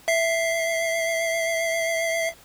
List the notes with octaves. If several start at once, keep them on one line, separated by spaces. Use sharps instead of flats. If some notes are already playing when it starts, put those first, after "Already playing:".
E5 C7